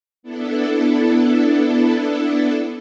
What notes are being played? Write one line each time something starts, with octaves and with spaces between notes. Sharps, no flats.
B3 D4 E4 A4